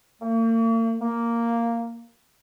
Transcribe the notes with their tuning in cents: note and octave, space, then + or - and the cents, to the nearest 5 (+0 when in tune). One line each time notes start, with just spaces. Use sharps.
A#3 -45
A#3 -5